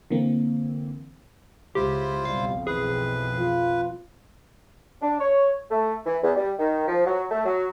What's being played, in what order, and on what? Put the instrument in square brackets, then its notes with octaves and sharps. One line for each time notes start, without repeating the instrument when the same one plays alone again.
[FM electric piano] D3 E3 A#3 C4
[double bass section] C#2 [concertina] E4 F4 C5 [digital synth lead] G4
[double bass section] B1 F2 [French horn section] G3 [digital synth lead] F5
[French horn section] E3 [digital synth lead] G#4 [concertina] B4
[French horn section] F4
[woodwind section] D4
C#5
A3
E3
E2
G3
D#3
F3
F#3
A3
F#3